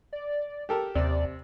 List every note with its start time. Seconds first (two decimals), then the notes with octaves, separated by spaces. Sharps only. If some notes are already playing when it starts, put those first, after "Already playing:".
0.13 D5
0.69 G4 A4 A#4
0.95 D#2 C3 D5